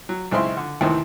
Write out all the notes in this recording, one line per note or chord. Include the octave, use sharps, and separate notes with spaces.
F#3
B1 C#3 G#3 C4 E4 C6
D3
D#2 A2 C3 D#3 E3 C4